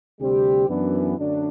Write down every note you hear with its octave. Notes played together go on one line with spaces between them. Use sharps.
D2 C3 G3 C4 G4
F#2 E3 B3 D4
F#2 D3 F#3 A3 D4